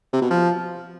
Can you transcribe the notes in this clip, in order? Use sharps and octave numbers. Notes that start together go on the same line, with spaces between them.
C3
B2
F3